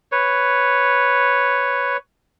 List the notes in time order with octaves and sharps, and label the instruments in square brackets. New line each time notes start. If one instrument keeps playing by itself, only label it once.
[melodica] B4 C#5